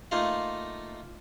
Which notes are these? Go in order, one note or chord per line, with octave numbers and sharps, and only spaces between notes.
A3 A#3 D#4 F4 F5